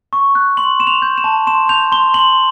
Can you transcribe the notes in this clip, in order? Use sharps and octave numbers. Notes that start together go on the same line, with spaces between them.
C#6
F#6
C6 F#7
C6 E7
F7
G6
E7
A5
C6 E7
G6 F7
C6 G7
C6 F#7